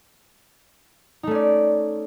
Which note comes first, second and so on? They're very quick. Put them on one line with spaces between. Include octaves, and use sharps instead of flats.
D#4 A3 C#4 D5